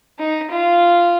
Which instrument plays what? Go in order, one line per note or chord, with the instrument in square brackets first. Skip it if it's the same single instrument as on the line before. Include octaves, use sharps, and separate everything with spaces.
[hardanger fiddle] D#4
F4